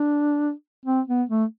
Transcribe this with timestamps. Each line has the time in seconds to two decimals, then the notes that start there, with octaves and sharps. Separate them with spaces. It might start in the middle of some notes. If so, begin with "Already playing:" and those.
Already playing: D4
0.85 C4
1.08 B3
1.29 A3